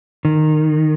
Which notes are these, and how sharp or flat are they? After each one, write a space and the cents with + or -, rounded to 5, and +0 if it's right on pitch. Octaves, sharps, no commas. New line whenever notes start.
D#3 -15